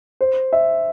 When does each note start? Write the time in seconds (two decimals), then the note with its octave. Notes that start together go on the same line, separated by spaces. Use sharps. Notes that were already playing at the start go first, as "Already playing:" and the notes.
0.21 C5
0.53 E5